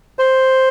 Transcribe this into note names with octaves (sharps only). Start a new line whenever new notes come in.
C5